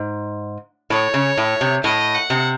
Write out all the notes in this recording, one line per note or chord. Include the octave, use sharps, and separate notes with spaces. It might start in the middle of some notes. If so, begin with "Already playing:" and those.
Already playing: G#2
A2 C#5
C#3
A2
C3
A2 D#5
F#5
C3